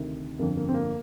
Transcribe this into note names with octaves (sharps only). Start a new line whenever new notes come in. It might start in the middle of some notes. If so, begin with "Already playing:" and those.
Already playing: D2 C3 D#3
G1 F2 D3 F3 A#3
A#3
C4
A#3